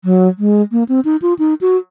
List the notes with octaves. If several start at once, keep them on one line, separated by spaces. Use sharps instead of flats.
F#3
G#3
A#3
C4
D#4
F4
D#4
F#4